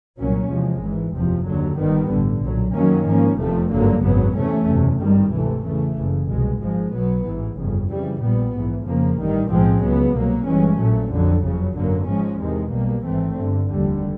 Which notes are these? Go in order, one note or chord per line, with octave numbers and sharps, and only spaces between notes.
C2 A#2 F#3 A#3 C#4
E2 C3 F3 G#3
G#1 G#2 E3
F#1 E2 C3 F3
D#2 D3 F#3
G1 G2 D#3 G3 B3
A1 G2 D3
B1 A#2 F#3
F#2 D#3 F#3 A#3 C#4
G#2 F3 A#3 C#4
F1 E2 C3 F3 A3
G#1 G2 D3 F#3 A#3
G#1 F#2 C#3 F#3 B3
E2 C3 E3 A3 C#4
F#1 E2 C3
G#1 G2 D#3 G3
D2 C3 E3 A3
E2 C#3 E3 A3
F#1 F#2 C#3
C2 B2 G#3
G#1 G#2 F3 G#3
B1 B2 F#3 B3
A1 G#2 E3
G1 F2 C#3
F2 C#3 E3 G3
A#1 A#2 G3 B3
A#1 G#2 E3
F2 C#3 F3 A#3
A1 G2 D#3 G3
B1 A2 F3 G#3 C4
C#2 C#3 F#3 B3
C2 B2 F#3 A#3
G1 G2 E3 G#3 C#4
A#1 A#2 F#3 A3
F2 D3 F#3
F#1 F2 C#3 F#3
G#1 F#2 D3 F#3 A#3
G#2 F3 G#3 C#4
E2 C3 D#3 G#3
B1 B2 G3 A#3
G#1 G#2 E3 A3 C4
G1 G2 D3
F1 D#2 D3 G3